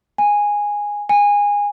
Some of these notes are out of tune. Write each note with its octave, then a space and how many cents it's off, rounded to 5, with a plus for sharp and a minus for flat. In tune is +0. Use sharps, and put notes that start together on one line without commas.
G#5 -10
G#5 -20